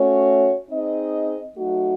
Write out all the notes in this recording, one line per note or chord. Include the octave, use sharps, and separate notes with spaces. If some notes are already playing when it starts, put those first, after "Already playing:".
Already playing: A3 C#4 F#4 C#5
C4 D#4 G#4 D#5
F#3 A3 D#4 F#4